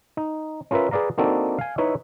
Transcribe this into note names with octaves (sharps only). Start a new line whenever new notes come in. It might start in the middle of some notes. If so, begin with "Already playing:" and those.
D#4
C#4 F4 A#4 B4 E5
G#4 B4 D5 F5 A#5
A#3 C4 D4 D#4 F#4 A4
F5 G#5
D#4 E4 B4 C#5 E5